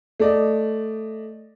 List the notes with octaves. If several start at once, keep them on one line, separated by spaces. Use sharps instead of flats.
A3 D5 D#5